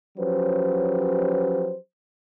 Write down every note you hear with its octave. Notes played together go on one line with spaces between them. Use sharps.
F3 F#3 C#4 G4 B4 C5